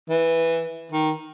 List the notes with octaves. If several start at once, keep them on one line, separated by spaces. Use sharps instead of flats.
E3
D#3